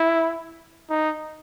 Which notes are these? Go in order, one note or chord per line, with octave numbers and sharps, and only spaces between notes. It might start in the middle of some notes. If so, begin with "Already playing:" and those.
Already playing: E4
D#4